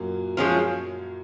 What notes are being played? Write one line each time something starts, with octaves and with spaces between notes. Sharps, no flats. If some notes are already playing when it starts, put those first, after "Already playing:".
Already playing: F#2 A#2 F#3 A#3
F3 G#3 C#4 F4